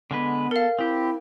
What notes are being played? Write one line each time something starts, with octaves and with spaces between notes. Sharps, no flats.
D3 G#3 B3 B4
A4 A#4 F5
C4 E4 G4